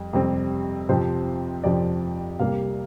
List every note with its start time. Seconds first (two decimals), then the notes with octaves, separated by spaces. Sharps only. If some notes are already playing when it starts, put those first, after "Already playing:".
Already playing: F2 G3
0.13 F2 C3 G3 C4
0.89 F2 C3 F3 C4 C5
1.64 F2 C3 F3 C4 D5
2.40 C2 C3 G3 A#3 F5